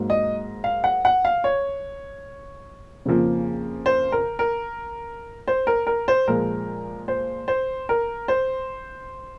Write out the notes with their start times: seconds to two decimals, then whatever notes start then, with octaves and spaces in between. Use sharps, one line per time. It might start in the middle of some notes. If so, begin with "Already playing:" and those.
Already playing: G#2 F#3 A#3
0.10 D#5
0.64 F5
0.84 F#5
1.05 F#5
1.25 F5
1.44 C#5
3.05 F2 C#3 F3 A#3
3.86 C5
4.12 A#4
4.39 A#4
5.48 C5
5.67 A#4
5.87 A#4
6.08 C5
6.28 A#2 F3 G#3 A#4
7.08 C5
7.48 C5
7.89 A#4
8.28 C5